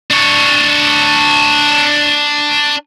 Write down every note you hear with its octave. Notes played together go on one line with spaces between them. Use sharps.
D4 C#5